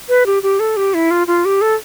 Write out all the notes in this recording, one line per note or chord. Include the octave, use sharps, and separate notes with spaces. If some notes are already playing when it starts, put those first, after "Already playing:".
B4
G4
G4
A4
G4
E4
F4
F4
G4
A4